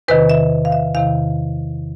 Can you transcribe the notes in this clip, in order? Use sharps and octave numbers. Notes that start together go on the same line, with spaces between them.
E2 C3 D#3 B4
E5
F5
E5
E2 C3 D#3 F5